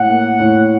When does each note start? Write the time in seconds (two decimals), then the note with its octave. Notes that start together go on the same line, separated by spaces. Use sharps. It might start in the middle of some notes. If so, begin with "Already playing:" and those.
Already playing: A2 F#5
0.09 A#3
0.40 A2